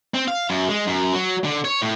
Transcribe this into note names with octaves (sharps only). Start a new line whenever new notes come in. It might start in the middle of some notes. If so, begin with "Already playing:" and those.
C4
F5
F#2
G#3
F#2
F#3
D3
C#5
A2